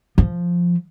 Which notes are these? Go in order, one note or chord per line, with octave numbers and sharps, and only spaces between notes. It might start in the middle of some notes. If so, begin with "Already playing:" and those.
F3